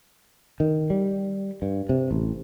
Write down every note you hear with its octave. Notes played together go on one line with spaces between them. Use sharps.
D#3
G3
G2
C3
A1